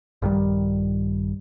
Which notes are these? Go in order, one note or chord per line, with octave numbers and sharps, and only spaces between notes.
A#1 G2 D#3 G3